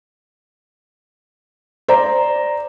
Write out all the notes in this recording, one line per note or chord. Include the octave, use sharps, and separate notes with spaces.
C5 D5 A#5